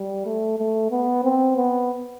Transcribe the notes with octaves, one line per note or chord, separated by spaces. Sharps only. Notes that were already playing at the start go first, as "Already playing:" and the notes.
Already playing: G3
A3
A3
B3
C4
B3